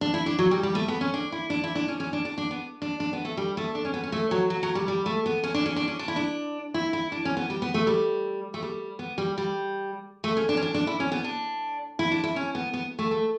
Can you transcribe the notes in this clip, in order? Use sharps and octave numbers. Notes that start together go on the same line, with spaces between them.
D4
E4
D4
F#3
G3
G3
A3
B3
C#4
D4
E4
D4
E4
D4
C#4
C#4
D4
D4
D4
B3
D4
D4
B3
A3
G3
A3
D4
C#4
B3
C#4
A3
F#3
F#3
F#3
G3
G3
A3
B3
C#4
D4
C#4
D4
C#4
D4
E4
D4
E4
E4
D4
C#4
B3
G3
B3
A3
G3
A3
G3
B3
G3
G3
A3
C#4
D4
C#4
D4
D4
E4
C#4
B3
D4
E4
D4
E4
C#4
B3
B3
A3
A3